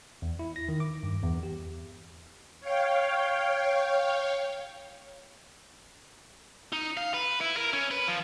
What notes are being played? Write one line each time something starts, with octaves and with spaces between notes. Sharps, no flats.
E2
E4
A#6
D#3
D6
G2
E2
G4
C#5 F5 G5
D#4
F5
B4
E4
A#4
C#4
B4
F3